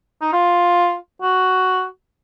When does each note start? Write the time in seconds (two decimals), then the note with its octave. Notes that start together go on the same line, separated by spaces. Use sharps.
0.21 D#4
0.33 F4
1.22 F#4